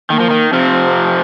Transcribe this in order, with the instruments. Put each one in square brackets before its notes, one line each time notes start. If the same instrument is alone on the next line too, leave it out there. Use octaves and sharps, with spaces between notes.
[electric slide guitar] D#3 [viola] A#3
[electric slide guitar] F3
D#3
[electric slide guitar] C3 F3 [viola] C4